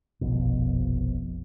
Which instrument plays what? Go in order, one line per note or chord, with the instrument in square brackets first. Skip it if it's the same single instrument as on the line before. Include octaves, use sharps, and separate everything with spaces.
[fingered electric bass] F1 A#1 F2 B2